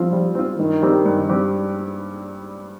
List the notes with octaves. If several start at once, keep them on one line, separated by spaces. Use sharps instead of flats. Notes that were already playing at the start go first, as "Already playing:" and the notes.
Already playing: F3 G3 C4 F4
G3
C4 F4
G2 D#3
G3 C4 G4
G2
G3 C4 G4